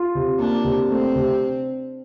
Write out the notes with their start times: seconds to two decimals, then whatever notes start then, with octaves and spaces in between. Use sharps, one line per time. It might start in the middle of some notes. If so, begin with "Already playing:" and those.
Already playing: F4
0.15 C3
0.39 A#3 D4
0.64 C3
0.90 A3 C4
1.15 C3